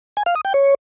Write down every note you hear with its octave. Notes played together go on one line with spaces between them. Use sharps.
G#5
F5
D#6
G5
C#5